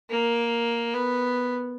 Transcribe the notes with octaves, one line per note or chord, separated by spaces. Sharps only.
A#3
B3